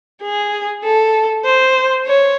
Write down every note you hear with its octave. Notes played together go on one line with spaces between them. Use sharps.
G#4
A4
C5
C#5